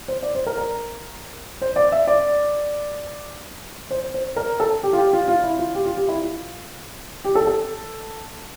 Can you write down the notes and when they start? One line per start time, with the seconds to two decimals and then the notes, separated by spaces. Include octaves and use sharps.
0.08 C5
0.23 D5
0.35 C5
0.47 A#4
0.57 A#4
1.62 C5
1.76 D5
1.92 E5
2.07 D5
3.91 C5
4.14 C5
4.36 A#4
4.60 A4
4.83 G4
4.93 F4
4.98 G4
5.13 F4
5.28 F4
5.44 E4
5.59 F4
5.75 G4
5.85 F4
5.97 G4
6.08 E4
6.21 F4
7.25 G4
7.35 A4
7.47 A4